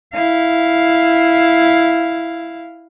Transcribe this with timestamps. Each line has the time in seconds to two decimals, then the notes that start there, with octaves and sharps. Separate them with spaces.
0.14 E4 F5